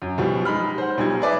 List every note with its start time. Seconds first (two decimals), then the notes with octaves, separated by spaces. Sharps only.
0.02 F#2
0.18 B1 B2 F3 G3
0.45 G#3 D#4 B5 F6
0.78 C5 F#5
0.97 B1 G3 D#4 F4 G#6
1.21 G#4 B4 D5 E5